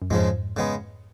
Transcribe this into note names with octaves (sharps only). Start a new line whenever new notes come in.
F#2
F2 G#2 C#3 F3 G#3
C#3 G#3 B3